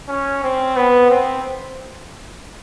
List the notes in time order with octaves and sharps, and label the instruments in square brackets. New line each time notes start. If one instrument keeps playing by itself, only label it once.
[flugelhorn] C#4
C4
B3
C4